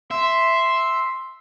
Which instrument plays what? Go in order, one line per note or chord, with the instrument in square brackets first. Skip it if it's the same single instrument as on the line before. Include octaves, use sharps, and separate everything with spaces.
[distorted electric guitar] E5 [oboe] C6